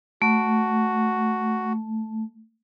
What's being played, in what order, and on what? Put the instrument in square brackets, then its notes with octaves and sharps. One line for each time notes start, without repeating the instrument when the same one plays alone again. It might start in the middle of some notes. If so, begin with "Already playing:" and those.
[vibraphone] A3 [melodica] F#4